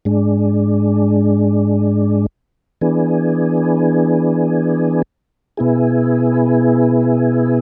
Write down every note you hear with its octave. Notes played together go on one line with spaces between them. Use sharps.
G#2 G#3 D4
E3 B3 D4 G#4
B2 B3 E4 G#4